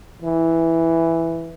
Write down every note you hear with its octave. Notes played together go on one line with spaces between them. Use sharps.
E3